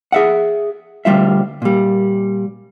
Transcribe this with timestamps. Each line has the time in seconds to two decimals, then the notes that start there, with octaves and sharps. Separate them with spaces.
0.12 G#4 E5 F#5
1.05 D2 G2 G3 F4 E5
1.62 A#2 G3